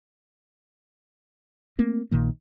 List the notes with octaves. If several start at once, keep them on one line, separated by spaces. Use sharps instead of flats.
A3 A#3 C4
A#1 A#2 D#3 A#3